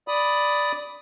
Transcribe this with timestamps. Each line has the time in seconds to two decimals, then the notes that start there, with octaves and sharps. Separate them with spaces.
0.08 D5 B5 D#6